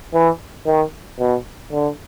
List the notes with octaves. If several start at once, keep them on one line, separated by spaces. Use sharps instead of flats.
E3
D#3
B2
D3